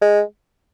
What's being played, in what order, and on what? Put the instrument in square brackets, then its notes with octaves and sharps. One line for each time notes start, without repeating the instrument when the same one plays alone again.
[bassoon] G#3